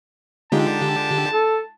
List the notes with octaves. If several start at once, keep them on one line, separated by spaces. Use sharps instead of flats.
D3 G#3 D#4 F4 G4 A5
A4